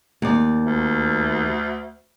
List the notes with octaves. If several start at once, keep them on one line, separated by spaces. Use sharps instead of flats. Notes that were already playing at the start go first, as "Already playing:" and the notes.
D#2 D5
D2